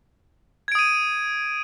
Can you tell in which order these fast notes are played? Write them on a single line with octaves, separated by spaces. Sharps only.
G#6 D7 D#6 D#7